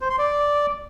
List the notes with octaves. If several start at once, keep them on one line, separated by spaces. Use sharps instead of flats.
C5
C6
D5